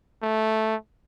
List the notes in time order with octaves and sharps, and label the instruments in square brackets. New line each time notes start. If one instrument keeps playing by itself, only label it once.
[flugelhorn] A3